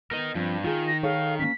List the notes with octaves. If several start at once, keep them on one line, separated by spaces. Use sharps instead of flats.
B3 A#4 D#5
G2 F3 C4
D#3 F4 G#4
A#6
G#4 A4 C#5 F5
A#3 C#4 B6